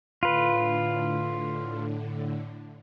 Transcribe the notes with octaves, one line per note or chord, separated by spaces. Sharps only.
A2 D3 F4 B4